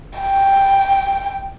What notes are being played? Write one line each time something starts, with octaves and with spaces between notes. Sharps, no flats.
G5